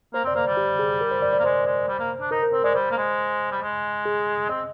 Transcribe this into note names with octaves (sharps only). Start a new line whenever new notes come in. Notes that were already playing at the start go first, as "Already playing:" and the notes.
A#3 C5
C4 D5
A#3 C5
G3
G4
G#4
A#4
C5
D5
D5
A#3
G#3 C5
G#3
G3
A#3
D4
D#4 A#4
A#4
C4 C5
G#3 D5
G3 C5
A#3
G#3
G3
G#3
G#4
C4 D#5